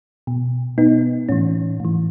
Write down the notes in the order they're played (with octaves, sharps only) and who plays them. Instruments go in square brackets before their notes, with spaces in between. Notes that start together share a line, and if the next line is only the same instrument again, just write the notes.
[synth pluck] B2
B2 B3 D#4
A2 E3 C#4
A2 E3